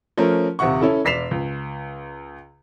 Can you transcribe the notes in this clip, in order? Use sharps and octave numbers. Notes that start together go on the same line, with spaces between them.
F3 A3 C#4 A#4
D#1 C3 E5 F#5 C#6
C#4 E4 A4
E1 D5 B6 C7 E7 F7
C#2